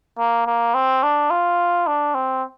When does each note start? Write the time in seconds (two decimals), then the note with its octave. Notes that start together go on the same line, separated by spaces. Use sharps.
0.19 A#3
0.46 A#3
0.74 C4
1.03 D4
1.30 F4
1.87 D4
2.15 C4